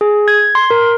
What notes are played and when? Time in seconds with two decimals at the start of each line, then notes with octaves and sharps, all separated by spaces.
0.01 G#4
0.28 G#6
0.55 C6
0.70 A#4